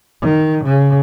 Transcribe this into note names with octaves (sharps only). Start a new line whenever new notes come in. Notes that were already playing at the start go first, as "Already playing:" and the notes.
D#3
C#3